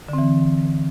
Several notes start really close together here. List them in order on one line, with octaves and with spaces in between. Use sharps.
D3 C4 E3